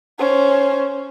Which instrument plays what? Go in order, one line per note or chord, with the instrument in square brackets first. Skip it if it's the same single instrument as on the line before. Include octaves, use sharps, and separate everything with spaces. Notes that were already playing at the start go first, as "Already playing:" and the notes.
[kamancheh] C#4 C5